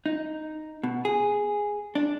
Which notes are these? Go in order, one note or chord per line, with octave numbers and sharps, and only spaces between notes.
D#4
B2
G#4
D4